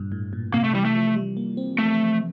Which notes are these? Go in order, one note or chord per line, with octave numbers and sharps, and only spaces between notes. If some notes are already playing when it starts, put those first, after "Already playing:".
Already playing: G2 A#2
A2
A#2
C3 A#3
A3
E3 G3
A3
F3
G3
A#3
C4
A3